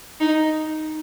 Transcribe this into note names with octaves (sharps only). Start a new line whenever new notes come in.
D#4